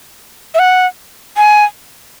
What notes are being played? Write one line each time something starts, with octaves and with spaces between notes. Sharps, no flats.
E5
F#5
G#5